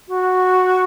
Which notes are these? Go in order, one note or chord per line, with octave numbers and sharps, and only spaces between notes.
F#4